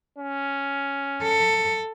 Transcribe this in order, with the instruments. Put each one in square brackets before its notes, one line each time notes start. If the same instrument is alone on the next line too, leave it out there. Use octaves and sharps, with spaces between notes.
[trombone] C#4
[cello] A4